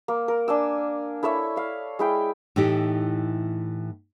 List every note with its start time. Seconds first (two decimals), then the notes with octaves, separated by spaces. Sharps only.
0.08 A#3
0.28 A#4
0.48 D4 G#5 E6
1.23 E4 A4 C#5 E5
1.56 F5 B5
1.99 G#3 E4 G5
2.56 A2 E3 D#4 G4